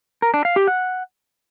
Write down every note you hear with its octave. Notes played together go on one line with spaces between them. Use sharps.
A#4
D4
F5
G4
F#5